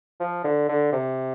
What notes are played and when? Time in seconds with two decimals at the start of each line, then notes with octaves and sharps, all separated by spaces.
0.20 F3
0.44 D3
0.69 D3
0.93 C3